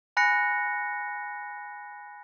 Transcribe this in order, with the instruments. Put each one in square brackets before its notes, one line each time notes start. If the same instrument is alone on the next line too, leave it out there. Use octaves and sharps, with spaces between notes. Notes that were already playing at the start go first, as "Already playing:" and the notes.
[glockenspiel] G#5 B5 F#6 A#6 C#7